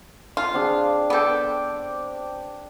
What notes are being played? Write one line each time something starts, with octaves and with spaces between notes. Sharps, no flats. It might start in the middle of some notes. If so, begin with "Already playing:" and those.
F4
C4 D4 G#4
B3 A4 D5 G5